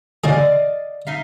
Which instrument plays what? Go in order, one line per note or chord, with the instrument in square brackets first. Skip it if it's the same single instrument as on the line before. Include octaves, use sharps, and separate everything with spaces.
[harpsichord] C#3 G#4 [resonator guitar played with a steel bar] D5 D#5 F5
[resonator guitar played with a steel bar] D#4 E5 F5